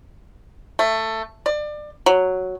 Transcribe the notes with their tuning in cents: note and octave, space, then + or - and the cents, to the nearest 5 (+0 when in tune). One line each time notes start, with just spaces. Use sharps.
A3 +15
D5 +30
F#3 +0